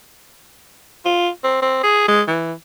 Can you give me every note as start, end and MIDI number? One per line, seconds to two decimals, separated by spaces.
1.06 1.29 65
1.44 1.60 60
1.62 1.83 60
1.83 2.04 68
2.08 2.22 56
2.28 2.53 52